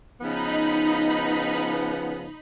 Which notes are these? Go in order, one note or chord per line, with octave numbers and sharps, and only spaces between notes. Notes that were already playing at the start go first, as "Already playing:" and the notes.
C#3 F3 B3 D#4 B5